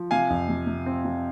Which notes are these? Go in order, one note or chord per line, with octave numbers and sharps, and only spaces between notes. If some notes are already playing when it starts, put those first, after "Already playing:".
Already playing: F3
C3 F5 G#5
F2
C3
C3
C4
C3